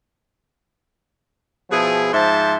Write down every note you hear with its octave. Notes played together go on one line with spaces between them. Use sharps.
B2 F3 E4 G#4
G#2 F3 C5 E5 A5